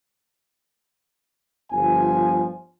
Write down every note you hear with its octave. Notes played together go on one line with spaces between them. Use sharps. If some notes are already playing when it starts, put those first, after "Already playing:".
G1 F3 G#5